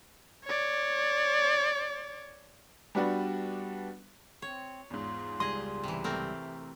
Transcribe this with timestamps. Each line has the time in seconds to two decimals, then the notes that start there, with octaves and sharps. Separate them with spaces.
0.45 C#5 D5
2.95 G3 B3 D4 F#4 B4
4.42 C4 C#5
4.90 E2 G#2 F4
5.40 C#2 G3 G#4 D#5 C6
5.84 C3 E3
6.04 A3 C4 G4 A#4